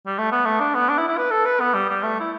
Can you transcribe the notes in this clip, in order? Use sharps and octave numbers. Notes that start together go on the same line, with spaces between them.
G3
A3
B3
A3
D4
B3
D4
E4
E4
B4
A4
B4
B3
G3
G3
A3
E4